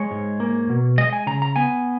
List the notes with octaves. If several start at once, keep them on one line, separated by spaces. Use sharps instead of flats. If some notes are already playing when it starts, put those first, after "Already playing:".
Already playing: G#3 C#5
G#2
A#3
B2
G#3 D#5
G#5
C#3 A#5
A#5
B3 G#5